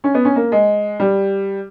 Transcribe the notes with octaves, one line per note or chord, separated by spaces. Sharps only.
C#4
B3
C#4
A#3
G#3
G3